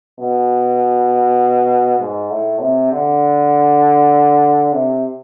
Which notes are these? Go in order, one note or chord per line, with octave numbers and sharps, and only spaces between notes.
B2
G#2
A2
C3
D3
C3